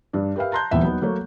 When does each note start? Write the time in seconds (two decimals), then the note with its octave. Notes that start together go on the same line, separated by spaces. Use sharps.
0.13 G2 D4
0.36 G4 A#4 B4 E5 F5
0.52 A5 A#5 C6 F#6 G6
0.71 D#1 E2 B3 E5
0.83 F#3 B3 D#4
1.01 F#3 A3 A#3 C#5